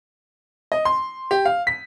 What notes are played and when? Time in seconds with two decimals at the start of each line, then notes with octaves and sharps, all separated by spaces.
0.72 D#5
0.85 C6
1.31 G4
1.45 F5
1.67 B6